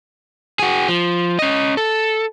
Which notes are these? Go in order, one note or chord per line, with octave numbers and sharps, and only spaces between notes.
F#4 G#4
F3
C#4 D#5
A4